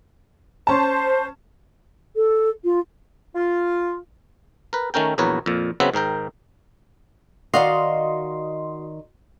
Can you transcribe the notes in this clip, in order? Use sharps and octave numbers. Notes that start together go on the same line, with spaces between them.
C#4 C5 A5
A4
F4
F4
A#4 B4
D#3 A3 C#4 A#4 G5
A#1 E2 F#3 A#4 B4 C#5
F2 A#2
C#3 F#3 B3 C4 E5 F#5
G#2 D#3 A#4 G5
D#3 F#4 D5 D#5 F5 C6